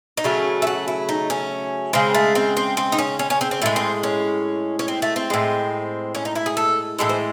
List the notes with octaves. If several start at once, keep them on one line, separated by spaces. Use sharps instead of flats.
D#4
C#3 F#3 A3 C#4
E4
F#4
E4
D#4
C#4
C#3 G#3 C4
A3
C4
C4
C4
D#4
C#4
C#4
C#4
C4
C4
A2 G#3 A3
C4
C#4
C#4
C4
A3
C4
A2 G#3
C#4
D#4
E4
G#4
A4
A2 E3 G#3 A4
C5